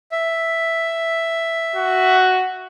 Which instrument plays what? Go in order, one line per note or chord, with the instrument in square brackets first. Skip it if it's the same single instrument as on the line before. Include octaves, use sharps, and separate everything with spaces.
[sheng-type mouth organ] E5
[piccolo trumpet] F#4